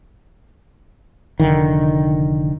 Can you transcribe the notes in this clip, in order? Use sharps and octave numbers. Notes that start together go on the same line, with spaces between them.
F1 D3 D#3